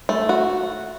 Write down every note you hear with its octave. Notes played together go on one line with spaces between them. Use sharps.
A3
F#4